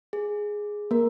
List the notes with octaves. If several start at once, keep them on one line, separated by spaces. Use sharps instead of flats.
G#4
A#3 A#4